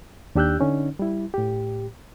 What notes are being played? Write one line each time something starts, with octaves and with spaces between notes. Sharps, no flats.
D#2 D4 G4 E6 F#6 G6
D3 C#4 D#4
G3 E4
A2 G4